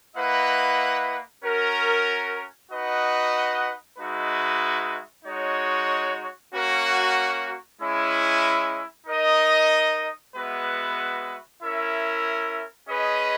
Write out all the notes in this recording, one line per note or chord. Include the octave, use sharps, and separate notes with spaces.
A#3 E4 B4 D#5 F#5
C#4 F#4 A#4
D#4 F#4 B4 D#5 F#5
G#3 D#4 F#4 B4 E5
G#3 D#4 F#4 C#5
A#3 C#4 F#4 A#4
G#3 C#4 E4
D#4 A#4 D#5
G#3 B3 F#4 B4 E5
C#4 E4 A#4 E5
C#4 G#4 B4 D#5